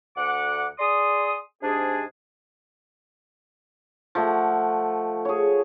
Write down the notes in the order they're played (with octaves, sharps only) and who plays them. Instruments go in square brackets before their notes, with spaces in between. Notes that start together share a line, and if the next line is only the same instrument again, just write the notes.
[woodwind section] D2 F#5 D6
G#4 D5 C6 D#6
G#2 C3 D4 G#4
[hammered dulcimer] F3 A3 F#5
G#4 C#5